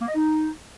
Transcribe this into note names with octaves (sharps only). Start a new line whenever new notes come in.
A#3
D#5
D#4